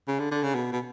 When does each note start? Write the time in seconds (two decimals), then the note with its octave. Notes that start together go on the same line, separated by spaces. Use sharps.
0.08 C#3
0.19 D3
0.31 D3
0.43 C#3
0.55 B2
0.72 B2